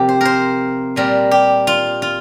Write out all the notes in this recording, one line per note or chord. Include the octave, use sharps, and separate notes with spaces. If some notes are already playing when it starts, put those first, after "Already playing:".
Already playing: C3 F3 A#3 G4
C5
A#4 C5
A#2 G3 C4 A#4
G4
F4
F4